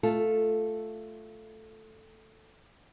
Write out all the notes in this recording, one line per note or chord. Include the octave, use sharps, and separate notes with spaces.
A3 F4 A4